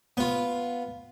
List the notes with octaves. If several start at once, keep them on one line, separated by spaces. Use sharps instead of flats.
B3 F4